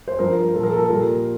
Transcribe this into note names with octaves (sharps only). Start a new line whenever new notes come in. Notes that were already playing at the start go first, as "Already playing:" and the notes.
C5
G2 F3 A#4
A#2 F3 A4
A#4
A4
A#4
A#2 G3